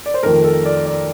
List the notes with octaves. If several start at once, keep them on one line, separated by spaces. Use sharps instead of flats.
D5
C5
F2 D#3 A3 A#4
A4
D5
D5